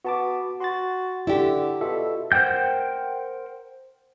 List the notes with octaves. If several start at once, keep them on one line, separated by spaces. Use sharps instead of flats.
B3 F#4 A5 D6
F#4 C6 A6
D3 E4 G4
B2 F4 A4 E5
A#4 C5 F#5 G5 G6